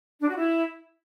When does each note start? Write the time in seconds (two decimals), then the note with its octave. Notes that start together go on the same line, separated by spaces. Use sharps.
0.21 D4
0.29 F#4
0.37 E4